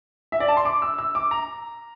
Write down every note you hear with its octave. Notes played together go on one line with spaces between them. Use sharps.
E5
D5
A5
C6
D6
E6
E6
D6
A#5